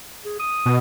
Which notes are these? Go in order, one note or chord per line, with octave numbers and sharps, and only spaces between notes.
G#4
D#6
B2